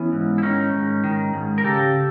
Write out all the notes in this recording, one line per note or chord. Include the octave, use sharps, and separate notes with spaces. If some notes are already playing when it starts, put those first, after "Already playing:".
Already playing: E3 B3 C#4
G#2
E4
D#3 C#4 D#4
G#2
D#3
G#2
A#4
C#3 G4 A4